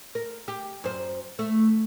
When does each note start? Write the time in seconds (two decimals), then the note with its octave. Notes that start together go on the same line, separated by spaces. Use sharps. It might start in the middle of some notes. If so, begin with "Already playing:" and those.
0.15 A#4
0.48 G4
0.84 F#2 C5
1.39 A3